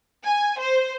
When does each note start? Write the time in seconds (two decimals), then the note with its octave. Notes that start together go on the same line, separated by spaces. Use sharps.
0.24 G#5
0.60 C5